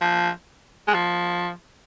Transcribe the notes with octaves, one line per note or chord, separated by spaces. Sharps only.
F3
G#3
F3